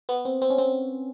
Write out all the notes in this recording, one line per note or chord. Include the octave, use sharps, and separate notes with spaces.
B3
C4
C4
C#4
C4